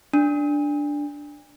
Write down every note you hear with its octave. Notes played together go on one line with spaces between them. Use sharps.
D4